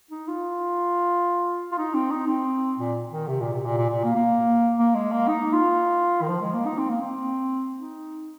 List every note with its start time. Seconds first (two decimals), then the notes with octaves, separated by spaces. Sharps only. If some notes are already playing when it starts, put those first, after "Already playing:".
0.11 D#4
0.28 F4
1.72 F4
1.78 D#4
1.94 C4
2.11 D#4
2.27 C4
2.78 A#2
3.11 D#3
3.28 C3
3.41 A#2
3.53 C3
3.66 A#2
3.77 A#2
3.90 A#2
4.04 A#3
4.16 A#3
4.79 A#3
4.95 G#3
5.11 A#3
5.28 D#4
5.53 F4
6.22 D#3
6.28 F3
6.41 G#3
6.54 A#3
6.66 D#4
6.78 C4
6.90 A#3
7.01 C4
7.79 D#4